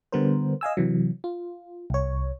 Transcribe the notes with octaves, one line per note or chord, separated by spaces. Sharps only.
D3 G3 B3 A#4 C5
D#5 F5 G#5 E6
C3 E3 F#3
F4
C2 C#5